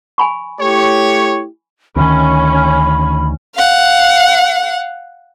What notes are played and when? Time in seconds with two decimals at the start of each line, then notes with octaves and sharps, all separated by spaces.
0.18 G#5 B5 C#6
0.60 A3 E4 G4 C#5
1.96 D2 D#3 C#4 B5
3.55 F5 F#5